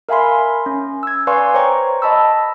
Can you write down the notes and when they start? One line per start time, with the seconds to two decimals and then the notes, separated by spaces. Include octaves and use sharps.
0.09 A#4 E5 F5 G#5 B5 C6
0.66 C#4
1.03 E6 G#6
1.27 B4 D5 F5 G#5 C6 C#6
1.54 C5 C#5 G5 A#5 C#6
2.02 D#5 A5 B5 E6